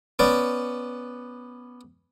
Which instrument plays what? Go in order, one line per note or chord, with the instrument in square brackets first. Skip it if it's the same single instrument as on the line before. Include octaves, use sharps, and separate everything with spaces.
[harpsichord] B3 C#4 D5